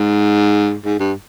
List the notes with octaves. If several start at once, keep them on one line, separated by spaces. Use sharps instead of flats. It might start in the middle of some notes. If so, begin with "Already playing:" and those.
Already playing: G#2
G#2
G2